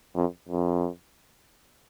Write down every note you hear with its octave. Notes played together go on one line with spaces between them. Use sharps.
F2
F2